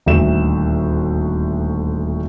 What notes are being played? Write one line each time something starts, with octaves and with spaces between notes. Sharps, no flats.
D#1 D2 E5 E7